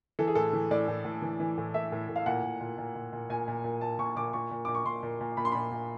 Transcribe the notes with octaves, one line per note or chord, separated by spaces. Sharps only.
E3 A4
G#4
A2 A4
E3
A2 D5
A2
A2
E3
E3
A2
A2 E5
A2
A2
F5
A#2 F#5
A#2
A#2
A#2
A#2
A#2
A#2 G#5
A#2
A#2
A#2 A5
A#2 C#6
A#2 D6
A#2 C#6
A#2
A#2 D6
C#6
A#2 C6
A#2
A#2
A#2 B5
C6
A#2 B5
A#2